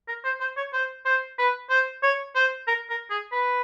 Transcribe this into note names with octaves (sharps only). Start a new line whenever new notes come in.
A#4
C5
C5
C#5
C5
C5
B4
C5
C#5
C5
A#4
A#4
G#4
B4